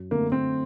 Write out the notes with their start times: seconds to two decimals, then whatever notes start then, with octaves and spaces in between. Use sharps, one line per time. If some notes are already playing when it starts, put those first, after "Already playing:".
Already playing: F#2
0.11 D3 A3 A#3 C4
0.32 C4